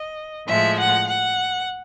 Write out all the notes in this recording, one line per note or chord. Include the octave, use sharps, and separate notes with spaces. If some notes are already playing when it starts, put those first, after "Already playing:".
Already playing: D#5
A2 F3 G#3 E5
F#5
F#5